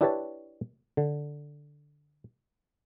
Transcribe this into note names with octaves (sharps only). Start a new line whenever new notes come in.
D4 E4 G4 B4 C#5 A5
D3